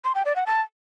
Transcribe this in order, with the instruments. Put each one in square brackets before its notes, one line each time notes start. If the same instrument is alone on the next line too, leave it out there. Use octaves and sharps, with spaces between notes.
[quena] C6
G5
D5
F#5
A5